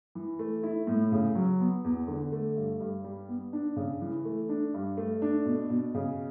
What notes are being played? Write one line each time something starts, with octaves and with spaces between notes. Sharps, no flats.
E3
A3
E4
A2
C#3
F#3
B3
E2
D3
A3
G2
G2
G3
B3
D4
C#3
E3
A3
D4
G2
A3
D4
B2
B2
C#3